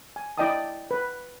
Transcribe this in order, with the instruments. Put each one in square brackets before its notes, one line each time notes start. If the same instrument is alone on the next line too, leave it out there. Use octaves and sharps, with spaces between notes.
[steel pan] G#5
E4 D5 D#5 G5 A5 D#6
B4